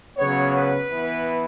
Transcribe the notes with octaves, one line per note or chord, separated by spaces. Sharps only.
C#3 F#3 B3 C#5
B4
E3 B3